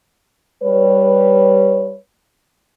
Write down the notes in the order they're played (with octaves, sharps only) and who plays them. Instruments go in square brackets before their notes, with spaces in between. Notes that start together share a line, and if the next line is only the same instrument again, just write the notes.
[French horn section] G3 B4 C#5